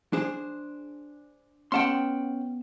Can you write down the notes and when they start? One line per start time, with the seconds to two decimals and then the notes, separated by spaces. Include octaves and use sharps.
0.13 D4 G#4 C5
1.72 B3 C#4 F#5 G5 A5 C6